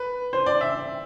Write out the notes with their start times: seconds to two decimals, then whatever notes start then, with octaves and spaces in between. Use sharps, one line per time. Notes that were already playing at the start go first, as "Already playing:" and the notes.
Already playing: B4
0.33 C5
0.46 D5
0.61 E5